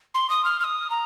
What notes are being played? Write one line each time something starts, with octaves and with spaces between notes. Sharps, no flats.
C6
D#6
F6
F6
D#6
A#5